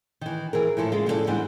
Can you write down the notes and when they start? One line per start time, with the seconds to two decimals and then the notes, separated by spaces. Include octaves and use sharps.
0.21 D#3 E3
0.53 E3 G#4 A#4
0.77 A2 E3 F3 A4
0.92 C#3 G#3 F4
1.06 F2 A2 C#3 E4 A4 D5
1.27 G#2 E3 G3 B3 D4